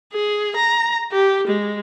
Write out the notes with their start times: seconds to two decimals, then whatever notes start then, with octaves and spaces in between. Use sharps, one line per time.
0.13 G#4
0.56 A#5
1.12 G4
1.47 G#3